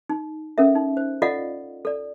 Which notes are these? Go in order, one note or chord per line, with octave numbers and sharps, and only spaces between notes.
D#4
C#4 A4 A#4 E5
D#4
C5
F4 A4 D5 D#5 F5 F#5
A4 D5